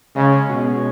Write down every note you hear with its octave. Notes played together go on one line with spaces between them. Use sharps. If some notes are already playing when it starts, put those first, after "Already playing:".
C#3 G#3
C#4
B2
B2